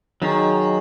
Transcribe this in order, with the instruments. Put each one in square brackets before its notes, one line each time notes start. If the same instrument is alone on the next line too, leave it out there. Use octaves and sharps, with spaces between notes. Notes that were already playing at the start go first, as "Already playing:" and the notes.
[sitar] D#3 [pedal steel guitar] F#3 D#4 G#4